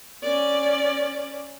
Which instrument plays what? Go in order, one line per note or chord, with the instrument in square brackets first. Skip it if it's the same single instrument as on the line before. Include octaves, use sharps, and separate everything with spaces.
[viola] C#4 D5